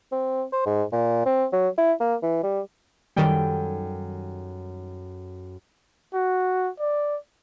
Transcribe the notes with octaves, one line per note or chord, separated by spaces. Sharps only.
C4
C5
G#2
A#2
C4
F#3
E4
A#3
E3
G3
F#2 D#3 G3 A4 G5
F#4
D5